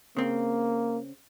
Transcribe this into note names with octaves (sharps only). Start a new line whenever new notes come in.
C#3 A#3 C4